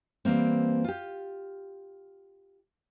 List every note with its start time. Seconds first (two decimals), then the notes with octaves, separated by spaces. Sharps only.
0.25 E3 G3 A#3 C4
0.84 F4 G4